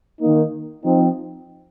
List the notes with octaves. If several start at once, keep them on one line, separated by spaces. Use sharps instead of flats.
D#3 A#3 D#4
F3 C4 D#4